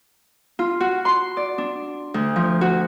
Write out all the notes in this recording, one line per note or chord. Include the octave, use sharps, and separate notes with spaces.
F4
F#4
C6
D5
D4
D2
F3
F#4